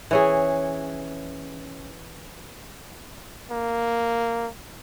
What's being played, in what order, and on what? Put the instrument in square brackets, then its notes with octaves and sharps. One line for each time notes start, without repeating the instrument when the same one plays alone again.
[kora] E3 C#4 G#4
[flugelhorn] A#3